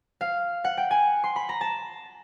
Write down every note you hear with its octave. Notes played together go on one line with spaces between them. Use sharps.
F5
F#5
G5
G#5
C6
B5
A#5
A5